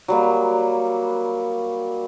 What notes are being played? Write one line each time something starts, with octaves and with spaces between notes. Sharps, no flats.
F#3 G3 A#3